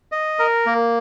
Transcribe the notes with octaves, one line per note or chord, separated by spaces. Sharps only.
D#5
A#4
A#3